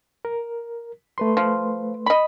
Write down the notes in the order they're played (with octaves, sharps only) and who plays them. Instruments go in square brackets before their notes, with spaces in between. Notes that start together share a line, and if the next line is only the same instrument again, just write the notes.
[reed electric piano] A#4
A3 B4 C6
[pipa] F3
D#5 B5